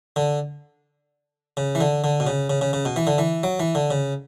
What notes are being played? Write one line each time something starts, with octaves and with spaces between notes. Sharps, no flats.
D3
C#3
E3
D3
D3
B2
C#3
C#3
C#3
C#3
B2
E3
D3
E3
F#3
E3
D3
C#3